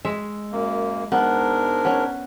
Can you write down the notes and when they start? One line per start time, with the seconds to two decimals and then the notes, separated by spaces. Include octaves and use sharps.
0.05 G#3 E5
0.52 F#2 A#3
1.12 G#2 B3 D4 A#4
1.85 B3 C#4